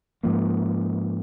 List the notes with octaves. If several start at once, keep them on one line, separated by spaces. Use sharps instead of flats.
G#2 F3 A#3